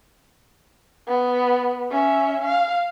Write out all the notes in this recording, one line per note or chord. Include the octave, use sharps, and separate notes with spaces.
B3
C#4 E5
F5